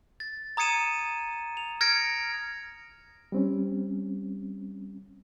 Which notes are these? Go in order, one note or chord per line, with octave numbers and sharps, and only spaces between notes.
A6
A#5 D#6 G#6 C#7 D#7 E7
F7
F6 G#6 A#6 C#7 D7
G3 C4 C#4